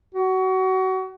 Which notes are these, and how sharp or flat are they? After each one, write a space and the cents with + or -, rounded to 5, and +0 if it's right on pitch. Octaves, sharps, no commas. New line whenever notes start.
F#4 +25